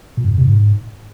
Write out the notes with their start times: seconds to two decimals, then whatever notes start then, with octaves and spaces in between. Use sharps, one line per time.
0.17 A#2
0.24 F#2
0.31 F2
0.38 C3
0.45 G#2